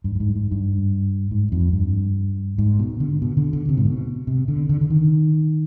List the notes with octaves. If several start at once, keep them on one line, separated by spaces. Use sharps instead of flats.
G2
G2
G#2
G#2
G2
G#2
F2
G2
G#2
B2
D3
B2
D3
D3
C3
G#2
B2
C3
D3
D3
D3
D#3